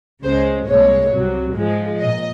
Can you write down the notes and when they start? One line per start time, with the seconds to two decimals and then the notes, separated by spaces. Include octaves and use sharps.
0.23 C#2 C#3 G#3 C5
0.67 C2 A#2 G#3 C#5
1.11 C2 C3 F#3
1.55 G#2 F3 G#3
2.00 A#2 D#5